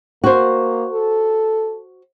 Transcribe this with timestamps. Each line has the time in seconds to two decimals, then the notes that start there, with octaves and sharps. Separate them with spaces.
0.24 A#3 F#4 C5
0.92 A4